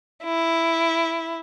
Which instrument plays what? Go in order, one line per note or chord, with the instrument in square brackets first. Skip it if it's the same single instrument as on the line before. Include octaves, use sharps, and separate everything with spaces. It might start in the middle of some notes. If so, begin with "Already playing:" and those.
[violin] E4